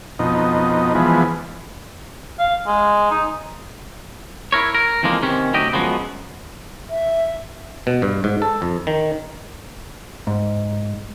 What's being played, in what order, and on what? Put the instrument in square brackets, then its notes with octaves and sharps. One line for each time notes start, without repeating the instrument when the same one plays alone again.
[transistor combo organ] F2 B2 D#4
E3 F3 G#3 B3
[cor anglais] F5
G#3
D#4
[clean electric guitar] E4 A#4 C#5
A#4
F2 E3 F3 G#3 A#3
C3 D#3 C4 C#4
D2 C3 F#3 G4 D#5
F#2 F3 F#3 G#3 B3
[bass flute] E5
[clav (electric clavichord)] B2
G2
G#2
A4
F2
D#3
[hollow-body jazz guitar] G#2